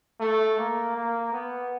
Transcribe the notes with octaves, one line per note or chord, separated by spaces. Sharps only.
A3
A#3
A#3
B3